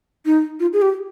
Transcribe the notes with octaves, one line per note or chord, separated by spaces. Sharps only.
D#4
F4
G#4
G4